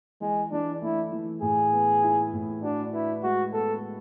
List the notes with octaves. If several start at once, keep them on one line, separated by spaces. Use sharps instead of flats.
E3 G#3
E3 D4
A3 E4
E3
A2 G#4
B3
E4
A2
D4 F#4
E4 B4
G#3 F#4
B3 A4